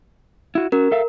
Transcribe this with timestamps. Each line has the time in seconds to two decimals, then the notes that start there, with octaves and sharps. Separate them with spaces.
0.55 E4 F#4
0.72 C#4 F#4 A#4
0.91 A4 E5 F5